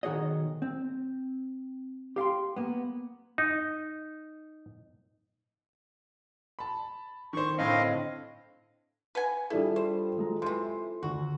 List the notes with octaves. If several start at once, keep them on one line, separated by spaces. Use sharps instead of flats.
B1 D#3 F#4 G#4 C#5 D#5
C4
G4 F5 G5 C6
A#3 B3
D#4
A5 B5
D#3 C5 C#6
A2 D3 C4 D#5 F5
B4 F#5 G#5
G3 D4 E4 F4 G#4 A4
C5
F#3 G#3 A#5
C3 E3 C6
D2 F#4